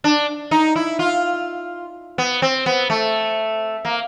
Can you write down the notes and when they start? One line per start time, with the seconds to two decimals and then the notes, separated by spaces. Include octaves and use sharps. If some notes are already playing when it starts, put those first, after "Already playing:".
0.04 D4
0.51 D#4
0.76 E4
0.99 F4
2.18 B3
2.42 C4
2.66 B3
2.90 A3
3.85 A#3